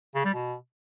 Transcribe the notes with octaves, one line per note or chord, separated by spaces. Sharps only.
C#3
G3
B2